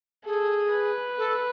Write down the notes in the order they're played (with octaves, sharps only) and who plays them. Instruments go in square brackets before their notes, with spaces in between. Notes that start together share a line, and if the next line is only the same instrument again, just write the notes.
[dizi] G#4 [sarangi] A4
[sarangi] B4
[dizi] A4